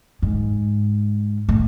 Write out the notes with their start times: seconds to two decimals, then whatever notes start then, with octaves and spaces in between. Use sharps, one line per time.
0.22 G#2
1.49 A2